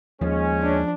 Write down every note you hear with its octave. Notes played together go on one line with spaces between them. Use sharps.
D#2 F3 G#3 C#4
D4